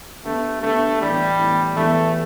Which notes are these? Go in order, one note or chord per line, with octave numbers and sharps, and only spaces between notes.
D3 A3 B3 G4
D3 A3 B3 G4
A2 E3 G3 B3
A2 E3 B3
E2 E3 A3 B3 G4